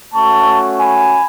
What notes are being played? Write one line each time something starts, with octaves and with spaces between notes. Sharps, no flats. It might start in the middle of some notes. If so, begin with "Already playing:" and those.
A3 C#4 F#4 A5 C#6
G#5 B5